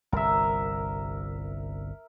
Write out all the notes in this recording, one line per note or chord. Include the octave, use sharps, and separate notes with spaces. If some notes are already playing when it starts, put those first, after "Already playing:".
G1 C2 A#4 E5